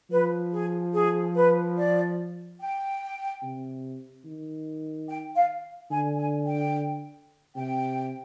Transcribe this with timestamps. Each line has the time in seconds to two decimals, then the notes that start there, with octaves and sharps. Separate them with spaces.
0.10 F3 B4
0.52 G#4
0.94 G#4
1.35 B4
1.77 D5
2.60 G5
3.42 C3
4.25 D#3
5.08 G5
5.36 F5
5.91 D3 G#5
6.19 G#5
6.46 G5
7.56 C3 G5